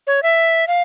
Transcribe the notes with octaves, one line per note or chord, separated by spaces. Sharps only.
C#5
E5
F5